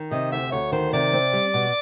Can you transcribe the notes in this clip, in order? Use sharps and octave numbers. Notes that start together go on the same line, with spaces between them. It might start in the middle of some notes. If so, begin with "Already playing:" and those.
Already playing: D#3
C3 D#5
D2 E5
D2 C#5
D#3 C5
C3 D5
C4
G3
B2